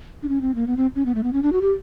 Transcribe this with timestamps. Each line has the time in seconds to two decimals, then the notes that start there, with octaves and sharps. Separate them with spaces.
0.23 D4
0.29 C#4
0.41 C4
0.55 A#3
0.67 B3
0.77 C4
0.96 C#4
1.06 B3
1.15 A3
1.23 B3
1.33 C#4
1.43 D4
1.53 F#4
1.61 G4